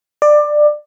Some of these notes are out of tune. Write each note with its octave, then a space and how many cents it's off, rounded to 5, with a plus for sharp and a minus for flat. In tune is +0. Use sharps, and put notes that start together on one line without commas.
D5 +20